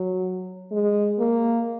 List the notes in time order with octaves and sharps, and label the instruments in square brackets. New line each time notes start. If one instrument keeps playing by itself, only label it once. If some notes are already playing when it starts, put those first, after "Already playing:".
Already playing: [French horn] F#3
G#3
A#3